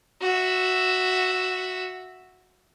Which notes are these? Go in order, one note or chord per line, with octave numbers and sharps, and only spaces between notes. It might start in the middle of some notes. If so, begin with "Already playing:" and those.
F#4 E5